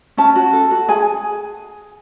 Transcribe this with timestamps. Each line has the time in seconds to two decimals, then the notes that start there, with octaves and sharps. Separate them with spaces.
0.17 C#4 A5
0.35 F#4
0.53 A4
0.71 F#4
0.88 G#4 G#5